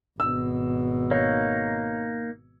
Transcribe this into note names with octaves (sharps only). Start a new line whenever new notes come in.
G#1 B2 E6
A#3 D#4 C#5